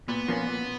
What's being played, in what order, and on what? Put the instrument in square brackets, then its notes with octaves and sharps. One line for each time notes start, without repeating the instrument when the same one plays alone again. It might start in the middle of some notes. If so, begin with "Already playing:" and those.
[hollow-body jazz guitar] A#2 [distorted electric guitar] B3
[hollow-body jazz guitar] F3 A#3 C#4
A#2